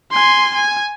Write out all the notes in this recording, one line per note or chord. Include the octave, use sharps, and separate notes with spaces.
G#5 C6
G#5